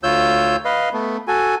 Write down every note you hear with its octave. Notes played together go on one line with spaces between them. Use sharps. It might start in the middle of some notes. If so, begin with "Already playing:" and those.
D2 F4 C#5 E6 G6
B4 D#5 F5
A3 B3
F#4 A4 G#5